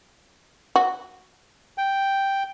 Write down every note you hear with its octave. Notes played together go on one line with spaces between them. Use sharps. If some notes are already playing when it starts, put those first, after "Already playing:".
F#4
G5